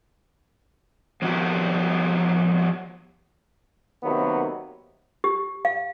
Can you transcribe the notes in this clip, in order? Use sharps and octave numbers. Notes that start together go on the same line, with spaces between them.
F3 F#3 B3 F#4 G4 A#4
C3 D#3 F#3 A#3 B3
G4
F5